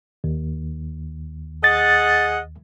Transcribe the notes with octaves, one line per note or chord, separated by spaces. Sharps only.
D#2
G#4 D#5 F#5 A6